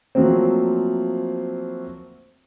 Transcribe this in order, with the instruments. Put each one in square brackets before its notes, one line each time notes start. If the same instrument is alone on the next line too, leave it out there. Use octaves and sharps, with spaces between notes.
[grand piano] F3 F#3 A3 A#3 C4